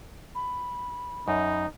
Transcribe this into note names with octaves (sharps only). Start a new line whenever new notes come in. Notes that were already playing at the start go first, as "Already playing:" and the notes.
B5
F#2 D#4